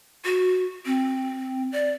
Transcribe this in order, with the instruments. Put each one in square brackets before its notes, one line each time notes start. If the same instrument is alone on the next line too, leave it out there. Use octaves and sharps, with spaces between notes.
[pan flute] F#4
C4
D5